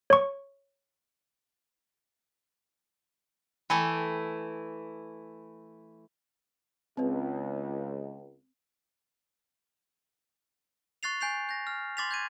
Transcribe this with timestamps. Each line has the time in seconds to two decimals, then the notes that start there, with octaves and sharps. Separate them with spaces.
0.10 C#5 C#6
3.70 E3 A3 E4 G5 G#5 B5
6.97 C#2 C4 B4
11.03 C#6 F#6 A6 C7 F7
11.21 G#5 G6 C7 F7
11.49 G6 A#6
11.67 F6
11.97 C6 D6 A6 B6 F7
12.11 G6 G#6 D#7